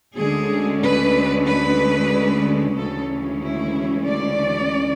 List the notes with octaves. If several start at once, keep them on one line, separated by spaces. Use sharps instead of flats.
D2 D3 G#3 C#4 G#4
B4
B4
D2 C#3 E3 G#3 C#4 A4
E4
D5